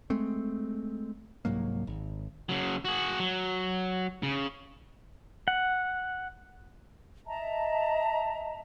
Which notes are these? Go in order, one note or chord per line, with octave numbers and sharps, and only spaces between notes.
G#3 A3 C4
C2 G#2 F#3 A#3
G#1
C#3 F#3
F#4 G#4
F#3
C#3
F#5
D#5 E5 A5 A#5